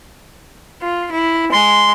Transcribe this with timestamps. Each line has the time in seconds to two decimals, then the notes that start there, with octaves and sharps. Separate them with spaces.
0.81 F4
1.12 E4
1.52 G#3 C6